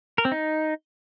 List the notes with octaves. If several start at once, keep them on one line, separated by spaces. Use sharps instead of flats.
A#4
C4
D#4